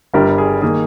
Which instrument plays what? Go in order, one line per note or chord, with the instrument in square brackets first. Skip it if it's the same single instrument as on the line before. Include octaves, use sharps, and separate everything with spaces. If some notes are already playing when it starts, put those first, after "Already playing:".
[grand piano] G1 G2 G3 A#4
G#4
D#3 A#3 G#4